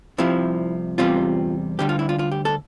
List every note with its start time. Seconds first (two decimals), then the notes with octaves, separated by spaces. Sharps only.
0.18 C2 C3 F3 E4
0.98 E2 C3 G3 C4 F4
1.79 D2 D3 G3 G4
1.89 F4
1.99 E4
2.09 F4
2.19 F4
2.32 G4
2.45 A4